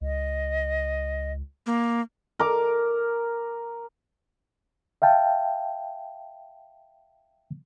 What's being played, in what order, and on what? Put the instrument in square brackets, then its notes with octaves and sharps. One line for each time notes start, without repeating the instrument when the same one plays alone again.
[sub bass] C#2 [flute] D#5
[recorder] A#3
[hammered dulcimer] A#4 D6
[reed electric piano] E5 F5 G5 A5